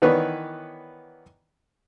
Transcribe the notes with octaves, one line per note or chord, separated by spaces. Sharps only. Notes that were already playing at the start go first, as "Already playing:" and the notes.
D#3 E3 B3 B4 C#5 D5